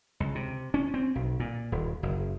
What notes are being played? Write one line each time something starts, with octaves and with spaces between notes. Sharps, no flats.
C#2
C3
C#4
C4
B1
A#2
D#1
F#1